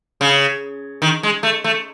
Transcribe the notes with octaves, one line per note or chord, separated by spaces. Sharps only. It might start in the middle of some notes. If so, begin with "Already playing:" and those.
C#3
D#3
G#3
A3
A3